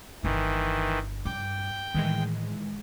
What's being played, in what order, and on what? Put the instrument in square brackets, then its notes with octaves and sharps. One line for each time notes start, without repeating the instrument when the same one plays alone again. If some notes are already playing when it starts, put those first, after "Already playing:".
[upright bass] G1 D4 [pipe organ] D#3 E3
[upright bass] G2 [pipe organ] G5 [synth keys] D6
[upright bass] A2 [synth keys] D#3 E3 G#3